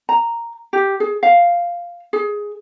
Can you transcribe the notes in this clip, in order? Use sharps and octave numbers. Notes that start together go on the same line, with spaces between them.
A#5
G4
G#4
F5
G#4